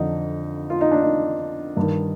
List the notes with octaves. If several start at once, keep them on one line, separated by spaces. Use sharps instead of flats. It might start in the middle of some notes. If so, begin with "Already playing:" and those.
Already playing: F2 D3 F3 D#4
F4
D#4
D4
D#4
G2 D#3